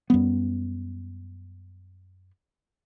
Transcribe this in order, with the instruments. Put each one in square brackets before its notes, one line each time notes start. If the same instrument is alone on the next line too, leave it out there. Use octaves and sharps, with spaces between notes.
[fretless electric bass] F#2 G3 B3